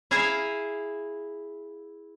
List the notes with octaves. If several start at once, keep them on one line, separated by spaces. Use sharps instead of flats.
E4 G#4 E5 F5 G#5 A#5